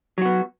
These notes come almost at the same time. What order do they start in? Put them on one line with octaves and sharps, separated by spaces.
F#3 F#4 B3